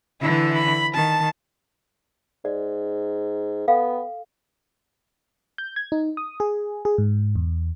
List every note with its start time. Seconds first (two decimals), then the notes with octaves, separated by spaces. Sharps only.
0.21 D3 E3 E4
0.54 B5
0.95 D#3 A5
2.45 G#2 D5
3.68 B3 A4 F5 G5
5.58 G6
5.76 G#6
5.92 D#4
6.17 D#6
6.40 G#4
6.85 G#4
6.98 G#2
7.36 E2